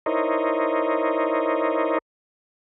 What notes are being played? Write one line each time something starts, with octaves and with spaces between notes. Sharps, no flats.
D#4 E4 A#4 C5 C#5 D#5